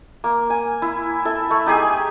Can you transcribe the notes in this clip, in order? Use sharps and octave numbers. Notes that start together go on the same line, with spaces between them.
A#3
G#5
E4
A4 E5
A3
D#4 G4 G#4 G#5